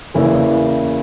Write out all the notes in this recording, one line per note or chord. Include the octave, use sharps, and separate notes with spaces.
E2 C#3 E3 A#3 E4